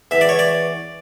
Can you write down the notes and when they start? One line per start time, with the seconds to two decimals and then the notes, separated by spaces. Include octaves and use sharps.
0.11 E2 E5
0.21 D5
0.29 C#5
0.39 D5